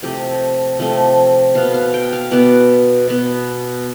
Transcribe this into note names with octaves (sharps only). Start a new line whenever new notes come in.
C3 F3 A3 G4
C3 F3 A3
B2 B3 F5
F5
G5
F5
B2 B3 D5
B2 B3